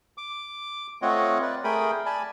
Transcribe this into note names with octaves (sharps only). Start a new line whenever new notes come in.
D6
A3 C4 F4 C#5 D#5 F#5
B4 D5
A3 G#4 A#4 G5 B5 D#6
D5 G#5 A5 B5